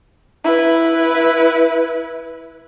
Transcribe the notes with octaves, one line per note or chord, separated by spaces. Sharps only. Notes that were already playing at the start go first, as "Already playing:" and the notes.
E4 B4